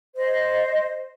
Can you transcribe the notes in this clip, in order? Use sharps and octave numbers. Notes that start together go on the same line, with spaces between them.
C5 D#5